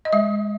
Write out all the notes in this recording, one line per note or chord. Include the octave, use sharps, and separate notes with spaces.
D#5
G#3 E5